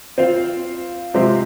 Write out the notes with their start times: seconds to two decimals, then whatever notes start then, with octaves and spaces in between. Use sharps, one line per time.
0.18 C4 F4 C5 F5
1.14 C3 F3 G#3 C4 G4